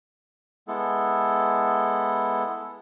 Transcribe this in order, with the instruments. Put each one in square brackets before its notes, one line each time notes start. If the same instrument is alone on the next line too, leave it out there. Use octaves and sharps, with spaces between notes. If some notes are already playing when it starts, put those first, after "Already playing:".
[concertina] G#3 B3 E4 A4